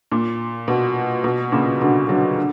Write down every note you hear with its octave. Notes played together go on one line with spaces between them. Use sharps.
A#2
B2
B2
A#2 C#3
B2 D3
D3 F#3
D3